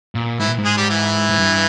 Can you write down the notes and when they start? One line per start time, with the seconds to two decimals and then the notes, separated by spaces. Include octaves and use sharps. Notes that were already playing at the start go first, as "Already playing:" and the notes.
0.15 A#2
0.40 G#2 E3 E4
0.49 A#2
0.59 G#2
0.65 G#3 G#4
0.77 G3 G4
0.90 E3 E4
1.30 G#2
1.39 G2